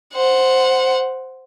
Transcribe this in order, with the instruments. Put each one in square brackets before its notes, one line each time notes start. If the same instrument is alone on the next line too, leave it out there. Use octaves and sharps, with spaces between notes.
[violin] C5 F#5